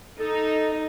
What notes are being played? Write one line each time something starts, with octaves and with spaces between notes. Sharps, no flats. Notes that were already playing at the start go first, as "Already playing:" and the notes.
D#4 A4